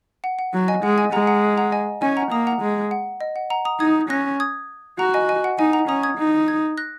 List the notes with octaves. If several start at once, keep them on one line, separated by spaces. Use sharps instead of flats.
F#5
F#5
F#3
D#5 G#5
G#3 F#5
D#5 G#5
G#3 F#5 A#5
F#5 A#5
F#5 A#5
D#5 G#5
C#4 D#5 G#5
F#5 A#5
A#3 A#5 D#6
F#5 A#5
G#3
F#5
D#5
F#5
F#5 A#5
A#5 D#6
D#4 D#6 G#6
C#4 F#6 A#6
D#6 G#6
F#4 F#5 A#5
D#5 G#5
D#5 G#5
F#5
D#4 D#5 G#5
F#5 A#5
C#4 A#5 D#6
D#6 G#6
D#4
D#6 G#6
F#6 A#6